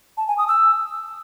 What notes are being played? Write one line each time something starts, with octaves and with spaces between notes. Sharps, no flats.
A5
G#5
D#6
E6